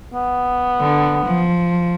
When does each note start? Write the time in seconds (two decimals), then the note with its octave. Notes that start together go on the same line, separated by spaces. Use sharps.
0.14 B3
0.81 D3
1.25 F3